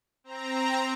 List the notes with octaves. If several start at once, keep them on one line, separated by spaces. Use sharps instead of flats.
C4 A#5